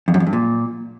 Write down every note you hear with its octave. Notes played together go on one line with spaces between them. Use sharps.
F2
F#2
F2
G2
A#2